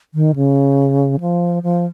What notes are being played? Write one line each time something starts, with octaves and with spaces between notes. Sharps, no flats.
D#3
C#3
F3
F3